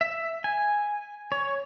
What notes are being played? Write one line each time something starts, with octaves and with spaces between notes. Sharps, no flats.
E5
G#5
C#5